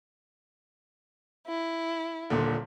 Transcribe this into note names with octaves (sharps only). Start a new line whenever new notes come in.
E4
D#1 A#2 D3